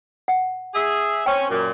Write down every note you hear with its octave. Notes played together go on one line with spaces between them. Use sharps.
F#5
G#4 E5
C4 C#4 G5
F#2 A#2